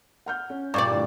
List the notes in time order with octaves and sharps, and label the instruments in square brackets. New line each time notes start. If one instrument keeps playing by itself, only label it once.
[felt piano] F#5 F6 G6
C#4
[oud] G2 A#2 D5 [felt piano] C#6
[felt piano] A2 D3 G3